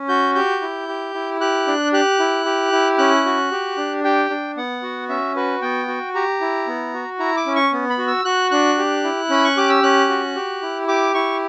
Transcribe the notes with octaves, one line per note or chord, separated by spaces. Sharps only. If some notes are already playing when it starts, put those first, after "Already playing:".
Already playing: C#4
F#4 G6
G4 G6
E4
G4
E4
G4 F#6
D4
G4 F#6
E4
G4
E4
C#4 F#6
F#4
G4
D4
G4 G5
D4
B3 F#5
F#4
C#4 E5
F#4 B4
B3 G5
F#4
G4 A#5
E4
B3
F#4
E4 A#5
D6
C#4
C#6
B3
B5
F#4
E6
F#4 F#6
D4 F#6
G4
E4
C#4 B5
C#6
G4 D6
E6
C#4 F#6
F#4
G4
E4
G4 D6
E4 C#6